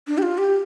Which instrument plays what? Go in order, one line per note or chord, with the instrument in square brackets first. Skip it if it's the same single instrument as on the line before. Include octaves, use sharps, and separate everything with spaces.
[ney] D4
G4
F4
G4